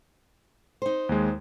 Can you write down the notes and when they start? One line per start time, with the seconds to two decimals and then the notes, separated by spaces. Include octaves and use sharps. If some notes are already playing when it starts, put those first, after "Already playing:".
0.82 D#4 C5
1.09 D#2 G#3